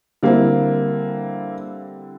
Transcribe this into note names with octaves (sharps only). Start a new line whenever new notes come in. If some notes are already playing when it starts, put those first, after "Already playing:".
D3 G3 A#3 C4 E4